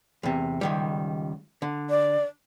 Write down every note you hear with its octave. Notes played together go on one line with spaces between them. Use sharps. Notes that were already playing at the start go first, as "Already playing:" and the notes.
E2 C3
C#2 D#3 G3
D3
D5